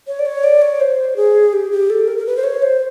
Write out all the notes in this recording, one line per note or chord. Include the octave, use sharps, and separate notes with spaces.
C#5
D5
C#5
D5
C#5
C5
G#4
G4
G4
A4
A#4
A#4
B4
C5
C#5
C5